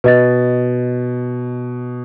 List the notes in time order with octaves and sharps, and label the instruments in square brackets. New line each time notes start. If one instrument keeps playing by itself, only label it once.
[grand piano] B2 [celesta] B4 D#5 A6